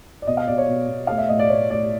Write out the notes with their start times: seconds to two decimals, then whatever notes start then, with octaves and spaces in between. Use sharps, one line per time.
0.22 D5
0.27 B2 D#5
0.37 F5
0.47 B2 D5
0.58 C#5
0.68 B2
0.88 B2
1.07 A3 F5
1.18 E5
1.29 A2 D#5
1.39 D5
1.49 A2 C#5
1.70 A2 D5